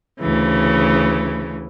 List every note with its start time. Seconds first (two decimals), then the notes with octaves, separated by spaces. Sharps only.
0.20 D2 C#3 E3